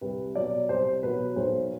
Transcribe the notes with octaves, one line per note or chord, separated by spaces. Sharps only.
C2 B4
B2 F#3 D5
C2 C5
B2 F#3 B4
B1 C5